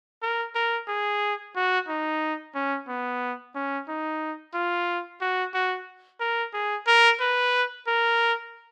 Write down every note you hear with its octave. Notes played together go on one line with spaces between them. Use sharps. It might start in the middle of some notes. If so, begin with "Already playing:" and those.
A#4
A#4
G#4
F#4
D#4
C#4
B3
C#4
D#4
F4
F#4
F#4
A#4
G#4
A#4
B4
A#4